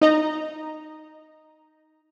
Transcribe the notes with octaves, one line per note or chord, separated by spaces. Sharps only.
D#4 D#5 A#5